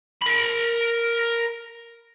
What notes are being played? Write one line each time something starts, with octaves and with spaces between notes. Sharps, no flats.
A#4 B5